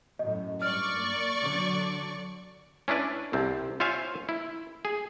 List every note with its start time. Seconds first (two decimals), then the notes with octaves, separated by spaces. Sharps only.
0.19 F#2 A2 D#5
0.62 G2 D5 C#6 F6
0.96 A#3
1.40 D3 F#3
2.88 C#4 D4 E4 B4 D5
3.33 C2 C3 C4
3.80 F4 C5 C#5 E5 F5 G#5
4.29 E4
4.85 G#4